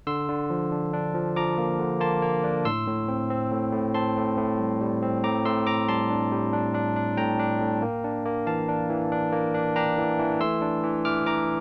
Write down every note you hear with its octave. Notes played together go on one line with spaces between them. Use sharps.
D3 C6 E6
D3
F3
D4
D4
F3
F3 A#5 D6
A#3
D3
A#3 A5 C6
A#3
D4
A2 C6 E6
A2
C4
C4
A2
A2
C4 A5 C6
A2
A2
G3
G3
C4
A2 A#5 D6
A2 C6 E6
A2 A#5 D6
G3 A5 C6
D4
G3
D4
D4
D4
A2 G5 A#5
D4
A2
A#3
D4
A#3
E3 F5 A5
D4
E3
D4
A#3
D4
D4 G5 A#5
E3
E3
A3 C6 E6
D4
E3
E3 D6 F6
E3 A#5 D6